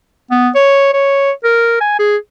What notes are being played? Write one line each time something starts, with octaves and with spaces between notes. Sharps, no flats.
B3
C#5
C#5
A#4
G#5
G#4